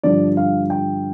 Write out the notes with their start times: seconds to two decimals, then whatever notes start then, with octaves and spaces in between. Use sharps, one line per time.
0.03 G2 D3 F3 D5
0.37 F5
0.70 G5